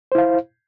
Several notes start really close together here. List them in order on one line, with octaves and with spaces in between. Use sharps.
C5 E4 F5